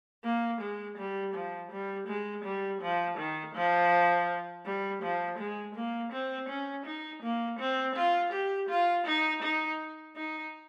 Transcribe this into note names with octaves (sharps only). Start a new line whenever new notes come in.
A#3
G#3
G3
F3
G3
G#3
G3
F3
D#3
F3
G3
F3
G#3
A#3
C4
C#4
D#4
A#3
C4
F4
G4
F4
D#4
D#4
D#4